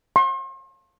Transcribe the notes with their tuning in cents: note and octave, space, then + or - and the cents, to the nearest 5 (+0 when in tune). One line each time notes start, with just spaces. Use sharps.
C6 +40